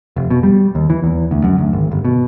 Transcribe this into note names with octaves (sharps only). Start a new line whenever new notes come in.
F1
B2
G3
D#2
E3
E2
D2
F#2
D2
G#1
G1
B2